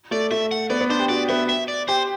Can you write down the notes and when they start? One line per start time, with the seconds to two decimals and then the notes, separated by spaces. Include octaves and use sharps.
0.11 A3 D5
0.31 A3 E5
0.51 F#5
0.70 B3 D5
0.81 B3
0.90 D4 C5
1.00 G4
1.09 F#4 D5
1.29 B3 E5
1.49 E5
1.68 D5
1.88 G4 C5